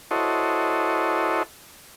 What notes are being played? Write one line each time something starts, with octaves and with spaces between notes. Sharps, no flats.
E4 F#4 A4 C5 C#5 D#5